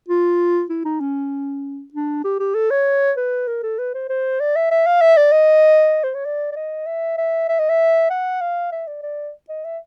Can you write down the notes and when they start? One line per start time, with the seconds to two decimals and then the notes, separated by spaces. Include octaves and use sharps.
0.09 F4
0.69 E4
0.85 D#4
1.01 C#4
1.94 D4
2.24 G4
2.40 G4
2.55 A4
2.70 C#5
3.17 B4
3.47 A#4
3.63 A4
3.79 B4
3.94 C5
4.09 C5
4.40 D5
4.56 E5
4.71 E5
4.87 F5
5.02 E5
5.17 D5
5.32 D#5
6.04 C5
6.15 C#5
6.25 D5
6.52 D5
6.56 D#5
6.86 E5
7.18 E5
7.49 E5
7.59 D#5
7.69 E5
8.10 F#5
8.41 F5
8.72 E5
8.88 D5
9.03 D5
9.49 D#5
9.65 E5